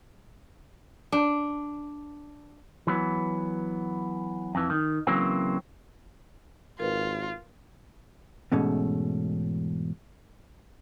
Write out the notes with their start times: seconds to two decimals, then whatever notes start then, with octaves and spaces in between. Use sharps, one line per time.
1.12 D4
2.87 E3 F#3 B3
4.55 F2 E3
4.70 D#3
5.07 C#3 E3 F#3 A#3 C4
6.80 G#1 F4 A#4 B4
8.52 E2 G#2 B2 A3 C#4